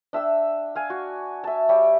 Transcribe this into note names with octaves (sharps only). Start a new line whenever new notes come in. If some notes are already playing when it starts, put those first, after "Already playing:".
D4 E5 G5 E6
F5 G#5
F#4
E5 A5
G3 G4 C#5 E5